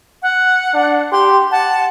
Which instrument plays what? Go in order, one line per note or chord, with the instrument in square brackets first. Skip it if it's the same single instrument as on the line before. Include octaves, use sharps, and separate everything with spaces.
[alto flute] F#5
[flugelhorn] D4
[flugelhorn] G4 [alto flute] C6
[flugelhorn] F#5 [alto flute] A5